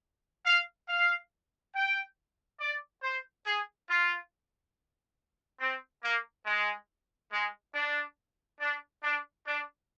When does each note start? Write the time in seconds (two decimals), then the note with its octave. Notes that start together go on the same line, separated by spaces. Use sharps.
0.46 F5
0.88 F5
1.75 G5
2.60 D5
3.03 C5
3.46 G#4
3.89 F4
5.60 C4
6.03 A#3
6.46 G#3
7.32 G#3
7.75 D4
8.61 D4
9.03 D4
9.46 D4